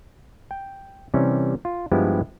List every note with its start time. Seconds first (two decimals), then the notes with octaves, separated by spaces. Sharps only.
0.51 G5
1.14 C3 E3 G3 C#4
1.65 F4
1.91 G2 F3 G#3 B3 E4 G4